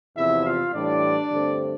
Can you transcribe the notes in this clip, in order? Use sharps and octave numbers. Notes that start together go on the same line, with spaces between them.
E2 C3 F3 E4 E5
F4 F5
A2 E3 G3 D4 D5
G2 D3 A3 C4